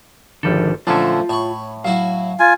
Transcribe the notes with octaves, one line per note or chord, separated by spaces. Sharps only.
G#1 D3 D#3 F3 G3 A4
A#2 D3 F3 A3 C#4 F4 A5
A2 C#5 B5 C#6
F#3 E4 F#4 F5
F4 G#5